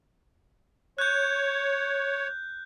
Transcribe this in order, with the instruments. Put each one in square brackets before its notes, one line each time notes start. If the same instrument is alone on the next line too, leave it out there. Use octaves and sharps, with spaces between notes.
[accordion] C#5 [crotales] F#6 G6